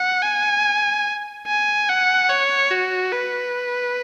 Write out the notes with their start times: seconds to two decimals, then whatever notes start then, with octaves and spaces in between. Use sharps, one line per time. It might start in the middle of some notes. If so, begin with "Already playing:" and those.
Already playing: F#5
0.22 G#5
1.47 G#5
1.89 F#5
2.29 C#5
2.71 F#4
3.12 B4